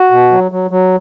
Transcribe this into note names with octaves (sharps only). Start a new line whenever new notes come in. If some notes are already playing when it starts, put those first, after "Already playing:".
Already playing: F#4
B2
F#3
F#3
F#3